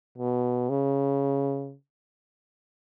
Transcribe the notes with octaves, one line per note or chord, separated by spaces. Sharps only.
B2
C#3